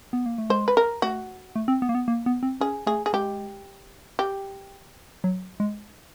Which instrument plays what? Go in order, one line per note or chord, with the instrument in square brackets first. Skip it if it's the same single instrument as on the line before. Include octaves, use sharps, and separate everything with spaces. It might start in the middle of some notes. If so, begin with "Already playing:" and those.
[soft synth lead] B3
A#3
A3
[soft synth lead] G#3 [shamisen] C5
[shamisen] B4
A#4
[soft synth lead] A3 [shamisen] F#4
[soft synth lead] A3
C4
B3
A#3
B3
A#3
B3
C4
[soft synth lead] C#4 [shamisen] G#4
[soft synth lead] A3 [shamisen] G#4
[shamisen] G#4
[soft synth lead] G#3 [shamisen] G4
[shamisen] G4
[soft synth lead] F#3
G#3